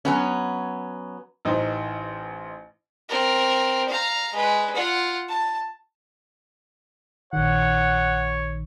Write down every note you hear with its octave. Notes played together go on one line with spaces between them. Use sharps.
F#3 B3 C#4
A1 E3 D#4 C5
C4 A#4
F5 A#5
G#3 B4
F4 F#5
A5
A#1 D#3 C#5 F#5